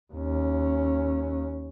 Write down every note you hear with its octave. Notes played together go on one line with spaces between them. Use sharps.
D#2 C#4